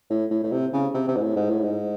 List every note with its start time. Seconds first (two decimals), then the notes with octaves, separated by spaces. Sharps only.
0.10 A2
0.31 A2
0.43 A2
0.52 C3
0.73 C#3
0.94 C3
1.08 C3
1.16 G#2
1.22 A2
1.36 G#2
1.50 A2
1.64 G#2